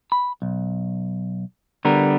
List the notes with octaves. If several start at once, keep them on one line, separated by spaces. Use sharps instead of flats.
B5
B1
D3 G3 B3 A#4